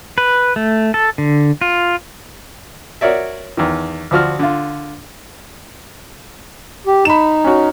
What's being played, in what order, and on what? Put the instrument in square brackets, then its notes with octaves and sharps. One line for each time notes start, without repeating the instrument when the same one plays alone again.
[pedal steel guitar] B4
A3
A4
D3
F4
[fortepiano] F#4 A#4 C#5 D5 E5
E2 D#3
D2 F3 F#4 F6
D3 F4
[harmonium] G4
[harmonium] D#4 [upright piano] B5 E7
[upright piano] C#4 F#4